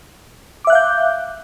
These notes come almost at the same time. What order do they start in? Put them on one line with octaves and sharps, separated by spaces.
D6 E5 F#6 F5 G6